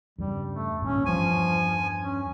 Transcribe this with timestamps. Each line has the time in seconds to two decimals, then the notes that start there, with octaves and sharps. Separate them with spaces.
0.18 E2 G2 C#3 G3
0.52 A3
0.82 G#1 G2 A#2 C#4
1.06 E2 G2 E3 F3 G#5
2.02 C#4